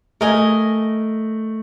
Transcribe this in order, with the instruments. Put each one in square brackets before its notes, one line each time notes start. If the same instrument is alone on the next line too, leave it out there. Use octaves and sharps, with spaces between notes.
[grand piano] A3 [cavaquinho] A#4 D#5 G#5